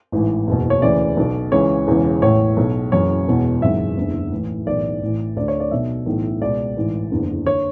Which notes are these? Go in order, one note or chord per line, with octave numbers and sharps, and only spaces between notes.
A1 G#2 E3
F#1 E2 B2
C#5
D2 C#3 E3 D5
B1 B2
C#2 C#3 E3 C#5
E1 E2 C#3 E3
A1 A2 E3 C#5
B1 B2
F#1 F#2 C#3 E3 C#5
E1 E2 B2
G#1 F#2 C#3 E3 E5
F#1 E2 D3
A1 A2 E3
B1 A2 E3 D5
A1 A2 E3
D2 D3 D5
C#5
D5
B1 B2 E5
B1 A2 E3
C#2 B2 D5
A1 G#2 E3
F#1 E2 D3
D3 C#5